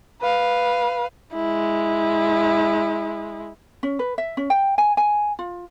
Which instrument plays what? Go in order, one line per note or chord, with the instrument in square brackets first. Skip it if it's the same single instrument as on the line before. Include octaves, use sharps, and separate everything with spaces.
[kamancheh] B4 F5
G#3 E4
[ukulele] C#4
B4
E5
C#4
G5
G#5
G#5
F4